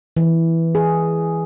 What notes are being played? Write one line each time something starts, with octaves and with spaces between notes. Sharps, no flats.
E3
G#4